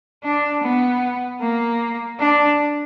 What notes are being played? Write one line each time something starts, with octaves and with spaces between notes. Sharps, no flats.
D4
B3
A#3
D4